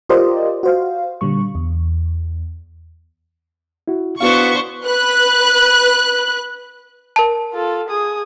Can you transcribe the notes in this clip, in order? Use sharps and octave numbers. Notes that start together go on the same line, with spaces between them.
F4 G4 A#4 C5 D5 D#5
F#4 C5 F5
A#2 D3 G3 C#6
E2
E4 F#4
B3 D4 E4 F#4 C5 F5 C#6
B4 F#6
A#4 A5
F4 A4
G#4 D#6